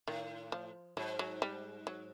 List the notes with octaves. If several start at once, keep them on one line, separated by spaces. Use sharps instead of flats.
A2 D#3
F3
G#2 F#3
F#3
G3
F#3